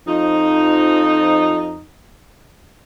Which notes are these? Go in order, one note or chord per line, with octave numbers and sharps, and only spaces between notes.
F2 F3 D#4